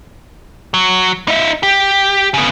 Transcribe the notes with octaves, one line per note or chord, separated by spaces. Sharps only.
F#3
D#4 E5
G4
C#3 B3